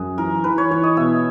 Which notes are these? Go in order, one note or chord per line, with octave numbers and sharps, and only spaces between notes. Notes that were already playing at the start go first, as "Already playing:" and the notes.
Already playing: F#2 F#4 G#4
E3 A#4
E3 B4
C#5
E3 C#5
D#5
B2 E5